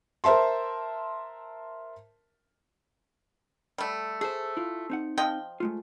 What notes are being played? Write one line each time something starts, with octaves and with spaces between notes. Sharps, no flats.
A#4 C5 E5 A5 C6
G3 A3
A3 G#4 C5
E4 F4
C4 D#4 F#5
F3 D#5 G5
G#3 A3 F4